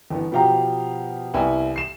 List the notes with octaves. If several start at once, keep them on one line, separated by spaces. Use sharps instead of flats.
G1 E3 B3
B2 F3 G4 F5 A#5
C2 B3 E4 E5 G#5
C7 E7